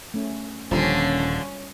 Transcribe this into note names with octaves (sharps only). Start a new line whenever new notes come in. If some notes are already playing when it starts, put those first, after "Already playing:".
A3 C#4
D#1 D3 F3 G3 C#4 F4 G4